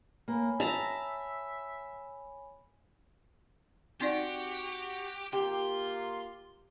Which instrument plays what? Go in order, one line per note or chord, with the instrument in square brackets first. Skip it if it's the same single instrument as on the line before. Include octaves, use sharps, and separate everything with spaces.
[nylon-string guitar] A#3 [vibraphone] C#5 G#5 B5
[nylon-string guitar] D#5 [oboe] E5 [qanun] A5 A#5
[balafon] C4 D#4 D5 [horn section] F#4 [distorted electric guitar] G4
[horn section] A#3 F4 [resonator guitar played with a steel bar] G4 [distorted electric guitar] C6